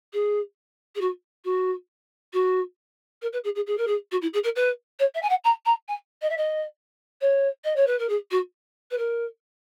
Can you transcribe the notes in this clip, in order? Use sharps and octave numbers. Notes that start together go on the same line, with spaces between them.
G#4
G#4
F#4
F#4
F#4
A#4
B4
G#4
G#4
G#4
A#4
G#4
F#4
E4
G#4
A#4
B4
C#5
E5
G#5
F#5
A#5
A#5
G#5
D#5
E5
D#5
C#5
D#5
C#5
B4
A#4
G#4
F#4
B4
A#4